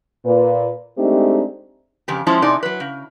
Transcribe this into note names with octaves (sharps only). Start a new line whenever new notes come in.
A#2 B4
G#3 A3 C4 D4 D#4 G4
F2 C#3 G4
F3 G#3 C#4 E4 C5 A5
C3 D#4 G#4 D5
F#3 B4
C#3